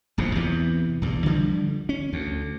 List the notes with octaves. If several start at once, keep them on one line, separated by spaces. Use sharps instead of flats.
D#1 A#1 E2 C3
E2 C3 E3
B1 E2 G2
D3 F3 G3
C#4
D2